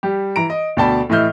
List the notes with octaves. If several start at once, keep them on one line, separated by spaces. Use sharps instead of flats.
G3 G4
E3 A#5 D7
D#5
D2 B2 D5 G5 A5 B5
A2 E3 D#5 E5 F6 G6